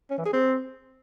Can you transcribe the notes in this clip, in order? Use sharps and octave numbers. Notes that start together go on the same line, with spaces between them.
C#4
E3
G#4
C4